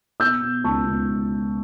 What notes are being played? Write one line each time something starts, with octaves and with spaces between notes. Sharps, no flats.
B2 E6 G6
B2
C#2 A5 C#6
C#2